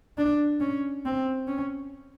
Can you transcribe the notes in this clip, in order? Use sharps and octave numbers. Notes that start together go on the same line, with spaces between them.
D4
C#4
C4
C#4